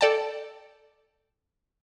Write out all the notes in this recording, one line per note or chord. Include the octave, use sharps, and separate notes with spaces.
A4 D5 G5 A5